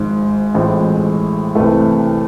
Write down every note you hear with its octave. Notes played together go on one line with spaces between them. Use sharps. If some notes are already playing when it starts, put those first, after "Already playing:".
Already playing: G#1 G#2 F3 G#3
A1 A2 G#3 C4 F4
C2 C3 E3 A3